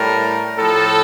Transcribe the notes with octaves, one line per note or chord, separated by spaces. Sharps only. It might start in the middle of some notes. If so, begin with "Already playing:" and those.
Already playing: A2 G3 A#4
A2 F3 A4